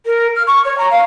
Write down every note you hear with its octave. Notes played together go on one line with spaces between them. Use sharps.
A#4
F6
C#6
C#5
A#5
F5